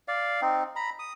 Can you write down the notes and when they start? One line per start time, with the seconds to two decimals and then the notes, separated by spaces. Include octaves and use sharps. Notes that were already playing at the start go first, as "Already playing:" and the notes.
0.08 D5 F5
0.42 C4 D#4
0.76 A#5 B5
0.99 D#6